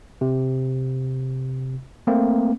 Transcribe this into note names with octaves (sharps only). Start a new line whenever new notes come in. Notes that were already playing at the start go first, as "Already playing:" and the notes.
C3
A3 A#3 C4